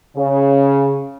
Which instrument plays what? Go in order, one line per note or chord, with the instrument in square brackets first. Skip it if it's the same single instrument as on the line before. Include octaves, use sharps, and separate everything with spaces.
[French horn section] C#3